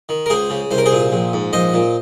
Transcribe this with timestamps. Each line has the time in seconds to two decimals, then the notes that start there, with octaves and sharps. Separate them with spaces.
0.09 D#3
0.26 A#4
0.30 C#2 G#4 C5
0.50 C#3
0.71 C2 C5
0.78 A#4
0.86 G#4 C5
0.92 A#2
1.13 A#1
1.33 G#2
1.53 A#1 C5 D#5
1.74 A#2